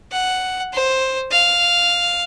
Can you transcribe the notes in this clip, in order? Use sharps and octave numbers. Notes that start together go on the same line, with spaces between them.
F#5
C5
F5